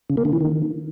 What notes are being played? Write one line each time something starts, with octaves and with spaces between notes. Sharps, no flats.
C#3
A#3
D3
E3
D#3